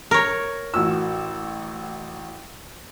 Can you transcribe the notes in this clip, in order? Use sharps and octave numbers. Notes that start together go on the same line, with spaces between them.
A#4 C#5
A1 F#4 E6